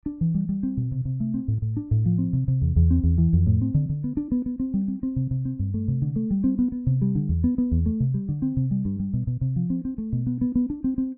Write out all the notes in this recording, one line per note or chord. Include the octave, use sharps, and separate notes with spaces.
D4
E3
G3
G3
C4
B2
C3
C3
A3
C4
A2
A2
D4
A2
F3
C4
C3
C3
E2
E2
C4
E2
E3
F2
A2
C4
D3
D3
B3
D4
B3
B3
C4
G3
C4
C4
C3
C3
C4
G2
A3
C3
D3
A3
G3
C4
B3
B3
C3
G3
D3
E2
B3
B3
E2
A3
C3
G3
D3
C4
C3
G3
G2
G3
B2
B2
C3
F3
C4
C4
A3
B2
B3
B3
B3
D4
C4
C4